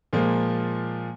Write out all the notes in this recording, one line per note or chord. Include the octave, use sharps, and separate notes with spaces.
A#2 F3 G#3 A#3